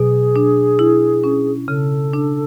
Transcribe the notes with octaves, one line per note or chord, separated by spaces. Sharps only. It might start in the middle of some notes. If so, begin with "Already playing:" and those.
Already playing: B2 F#3 G#4
D4
E4
C#4
C#3 A4
D4